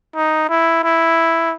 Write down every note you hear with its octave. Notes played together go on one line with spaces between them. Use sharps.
D#4
E4
E4